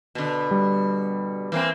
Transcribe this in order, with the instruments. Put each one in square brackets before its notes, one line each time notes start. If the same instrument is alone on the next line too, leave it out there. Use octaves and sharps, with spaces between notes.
[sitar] B2 D3
[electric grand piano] G3
[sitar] E3 A#3 C4